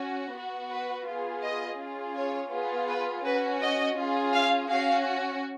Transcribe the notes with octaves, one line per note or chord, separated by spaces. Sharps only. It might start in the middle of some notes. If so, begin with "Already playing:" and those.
Already playing: C#4 F#4
B3 F#4
B4
B3 F4 G#4
D#5
C#4 F4 G#4
C#5
B3 F4 G#4
B4
C#4 F#4 B4
D#5
C#4 F4 G#4
F5
C#4 F#4 F5